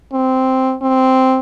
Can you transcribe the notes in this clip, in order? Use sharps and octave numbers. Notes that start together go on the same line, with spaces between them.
C4
C4